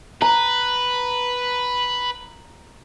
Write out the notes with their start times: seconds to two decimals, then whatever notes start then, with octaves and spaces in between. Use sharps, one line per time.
0.22 B4 A#5